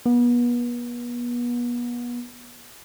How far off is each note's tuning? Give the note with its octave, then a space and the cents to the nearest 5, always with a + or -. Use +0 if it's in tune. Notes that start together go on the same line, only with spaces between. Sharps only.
B3 -35